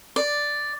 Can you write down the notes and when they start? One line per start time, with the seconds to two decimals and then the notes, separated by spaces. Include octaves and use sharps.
0.16 D5